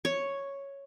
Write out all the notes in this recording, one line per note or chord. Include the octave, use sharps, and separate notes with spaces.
C#5